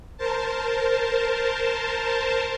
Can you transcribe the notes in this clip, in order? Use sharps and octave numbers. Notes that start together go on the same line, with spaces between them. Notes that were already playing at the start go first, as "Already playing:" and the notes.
A#4 C5 A5